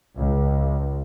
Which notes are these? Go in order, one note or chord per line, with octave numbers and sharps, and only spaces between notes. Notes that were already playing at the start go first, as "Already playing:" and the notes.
C#2